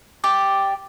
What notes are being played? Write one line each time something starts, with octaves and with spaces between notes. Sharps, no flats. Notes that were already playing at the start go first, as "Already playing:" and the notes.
G4 D5 D6